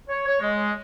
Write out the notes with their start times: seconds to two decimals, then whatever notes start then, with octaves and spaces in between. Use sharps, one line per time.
0.10 C#5
0.27 C#5
0.41 G#3